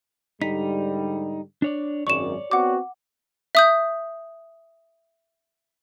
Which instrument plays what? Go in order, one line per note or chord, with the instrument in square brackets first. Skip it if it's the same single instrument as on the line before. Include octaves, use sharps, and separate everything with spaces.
[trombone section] G#2 D3 G3 [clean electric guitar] D#4 [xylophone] B6
[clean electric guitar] D4 C#5 D5
[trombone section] G#1 F#2 [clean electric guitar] C#5 D5 [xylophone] C#6 E7
[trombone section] B3 C4 F#4 [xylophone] F#5 D6
[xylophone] E5 D#6 G6